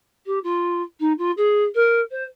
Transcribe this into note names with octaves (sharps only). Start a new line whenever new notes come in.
G4
F4
D#4
F4
G#4
A#4
C5